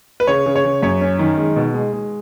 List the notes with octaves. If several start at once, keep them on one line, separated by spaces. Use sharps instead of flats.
B4
C#3 C#5
C#3
C#5
C#3
F#2 C#5
C#4
D#3
G#3
B2
G#3
G#3